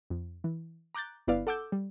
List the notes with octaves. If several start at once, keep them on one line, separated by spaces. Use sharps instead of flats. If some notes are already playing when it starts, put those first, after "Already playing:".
F2
E3
A#5 D6 F#6 G6 A6
G1 B3 E4 B4 D5 F5
A4 F#5 D6 E6 G6
G3